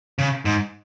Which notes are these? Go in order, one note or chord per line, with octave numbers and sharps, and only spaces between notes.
C#3
G#2